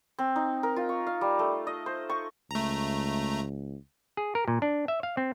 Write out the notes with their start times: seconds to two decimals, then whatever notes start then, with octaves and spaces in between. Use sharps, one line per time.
0.19 C4
0.36 D#4
0.63 A#4
0.76 F4
0.89 C#6
1.07 F5
1.21 G3
1.39 A3
1.67 D#5
1.86 C5
2.09 C#6
2.51 C#2 A3 A#5
4.17 G#4
4.35 A#4
4.48 A#2
4.62 D4
4.88 E5
5.03 F5
5.17 C4